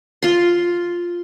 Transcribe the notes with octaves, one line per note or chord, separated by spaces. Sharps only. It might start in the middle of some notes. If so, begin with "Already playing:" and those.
F4 C6